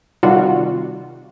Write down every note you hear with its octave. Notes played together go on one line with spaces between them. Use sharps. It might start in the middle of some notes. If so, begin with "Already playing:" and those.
C3 D#3 G3 F4 F#4